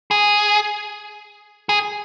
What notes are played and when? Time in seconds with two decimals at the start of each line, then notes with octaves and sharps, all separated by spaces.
0.11 G#4
1.69 G#4